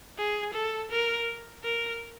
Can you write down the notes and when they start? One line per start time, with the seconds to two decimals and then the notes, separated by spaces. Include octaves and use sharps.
0.18 G#4
0.54 A4
0.91 A#4
1.64 A#4